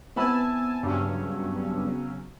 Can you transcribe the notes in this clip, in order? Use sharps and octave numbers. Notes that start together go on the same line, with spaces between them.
B3 C4 E4 B4 G#5 A5 B5 E6
G2 C#3 F#3 C#4